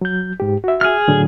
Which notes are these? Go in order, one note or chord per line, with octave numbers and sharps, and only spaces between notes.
F#3 G6
G#2 G4
F#4 E5
G#4 F6
A2 D3 F#3